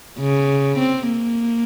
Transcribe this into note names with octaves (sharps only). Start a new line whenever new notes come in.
C#3
C4
A#3